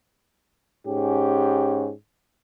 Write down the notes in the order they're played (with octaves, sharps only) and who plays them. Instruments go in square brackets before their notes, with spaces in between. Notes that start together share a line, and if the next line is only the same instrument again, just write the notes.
[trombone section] G#2 C#4 G4